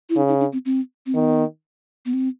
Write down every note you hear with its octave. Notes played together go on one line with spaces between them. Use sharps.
E4
C#3 D#4
D#4
D4
C4
C4
C4
D#3 B3
B3
C4